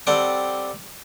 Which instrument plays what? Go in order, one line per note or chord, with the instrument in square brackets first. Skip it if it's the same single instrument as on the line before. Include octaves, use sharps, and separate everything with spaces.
[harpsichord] G3 C4 A4 D5 F#5